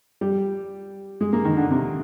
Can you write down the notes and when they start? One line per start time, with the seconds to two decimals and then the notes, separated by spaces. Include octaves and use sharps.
0.21 G3
1.21 G#3
1.33 A#3
1.45 D#3
1.57 D3
1.70 C3